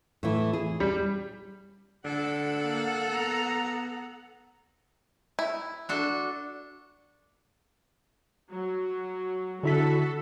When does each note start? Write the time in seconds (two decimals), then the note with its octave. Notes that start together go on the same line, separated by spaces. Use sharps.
0.23 A2 E3
0.53 G#4
0.80 G3
2.05 D3 A4 F#5
2.63 A#3
3.12 B3 A#5
5.39 E4
5.89 D4 F#4 A4
8.51 F#3
9.63 D3 E4 F#4 A4 B6